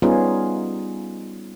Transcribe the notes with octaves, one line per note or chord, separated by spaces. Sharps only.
G3 B3 C#4 D#4 F4 G#4